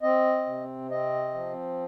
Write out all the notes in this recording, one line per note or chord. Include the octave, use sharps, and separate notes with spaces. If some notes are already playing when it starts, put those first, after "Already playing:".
C4 D#5
C3
C4 D#5
F3